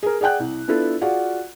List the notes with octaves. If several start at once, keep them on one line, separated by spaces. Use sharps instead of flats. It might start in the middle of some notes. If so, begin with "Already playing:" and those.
G#4 A#4
G#4 D5 F#5 G5 F#6
C2
B3 D4 E4 F4 A4 B4
F4 F#4 G#4 D5 F5 F#5